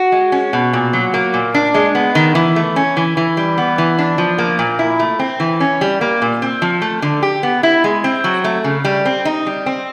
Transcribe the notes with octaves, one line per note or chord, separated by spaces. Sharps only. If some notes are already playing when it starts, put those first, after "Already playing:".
Already playing: F#4
G#3
C#4
B2
A#2
F#3
A#3
A#2
D4
G#3
B3
D#3
E3
A3
C#4
E3
E3
G3
B3
E3
D4
F3
A#3
A#2
E4
A3
C4
E3
C#4
G3
A#3
A#2
C4
F3
A3
D3
G4
B3
E4
G#3
C4
F#3
A3
C#3
G3
C4
D#4
G3
C4